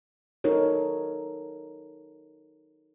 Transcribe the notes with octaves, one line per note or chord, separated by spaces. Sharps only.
D#4 F#4 A4 A#4 C#5